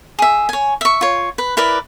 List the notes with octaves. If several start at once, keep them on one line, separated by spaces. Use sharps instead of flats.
G#4 E5
C#5 G#5
E5 C#6
F4 C#5
B4
E4 A#4 B4 D5